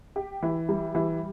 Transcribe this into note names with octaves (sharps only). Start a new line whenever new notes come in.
G4
E3
G3
E3